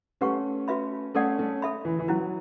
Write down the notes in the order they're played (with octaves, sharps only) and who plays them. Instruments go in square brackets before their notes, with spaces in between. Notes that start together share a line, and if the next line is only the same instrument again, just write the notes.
[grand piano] A3 C#4 [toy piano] G4 B4 F#5 C#6
[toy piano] F#4 B4 E5 B5
[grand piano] A3 C#4 [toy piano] A4 D5 F#5
[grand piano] A3 C#4
[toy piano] A4 E5 B5
[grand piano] E3
E3
[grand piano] F#3 [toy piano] C#4 E4 B4